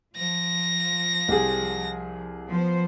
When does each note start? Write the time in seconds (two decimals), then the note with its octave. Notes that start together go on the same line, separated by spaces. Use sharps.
0.17 F3 A#6
1.28 C2 G4 G#4
2.48 F3 B3 C5